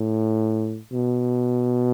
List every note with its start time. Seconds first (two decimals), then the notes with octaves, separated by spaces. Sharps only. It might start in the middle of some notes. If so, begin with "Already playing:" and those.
Already playing: A2
0.92 B2